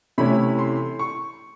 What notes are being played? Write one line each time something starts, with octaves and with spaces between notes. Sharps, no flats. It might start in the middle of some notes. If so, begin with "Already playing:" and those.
C3 E3 A3 C#4 E4 B5
C6
C#6